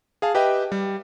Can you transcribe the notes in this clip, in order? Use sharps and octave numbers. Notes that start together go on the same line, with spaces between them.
G#4 F5 A5
G4 B4 D#5 E5 G5
G3